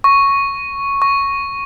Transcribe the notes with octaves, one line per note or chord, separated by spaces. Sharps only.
C#6
C#6